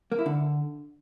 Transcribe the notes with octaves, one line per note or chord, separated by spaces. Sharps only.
A#3
E4
D3